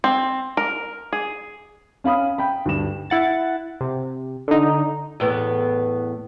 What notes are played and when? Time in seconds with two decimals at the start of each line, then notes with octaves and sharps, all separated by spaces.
0.04 C4
0.57 A#4
1.13 G#4
2.04 C#4 F5 B5 D#6
2.38 G5 B5
2.65 D2 G2 E7
3.10 E4 F#5 A6
3.81 C3
4.48 D3 D#4
5.20 E2 A2 B3